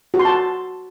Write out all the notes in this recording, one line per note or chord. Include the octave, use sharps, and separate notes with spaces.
F#4
C6
A5